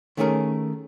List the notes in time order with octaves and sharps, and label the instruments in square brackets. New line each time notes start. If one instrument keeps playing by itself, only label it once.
[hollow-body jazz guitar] D#3 A3 C#4 G#4 A#4